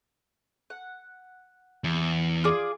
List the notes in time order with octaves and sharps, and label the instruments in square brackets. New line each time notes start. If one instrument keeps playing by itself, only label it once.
[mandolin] F#5
[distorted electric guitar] E2
[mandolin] F4 G#4 D5